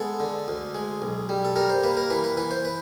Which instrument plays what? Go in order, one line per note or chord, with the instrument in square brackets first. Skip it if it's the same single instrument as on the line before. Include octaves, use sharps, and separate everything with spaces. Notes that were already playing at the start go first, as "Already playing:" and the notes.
Already playing: [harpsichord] G#3 B3 A4
D3
D2
G#3
B1
G3
A4
G3 A#4
C5
A#3 B4
A#4
E3 B4
B4
E3 B4
C5
B4